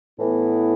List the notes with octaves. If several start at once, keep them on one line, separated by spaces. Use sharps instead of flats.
A2 E3 B3 E4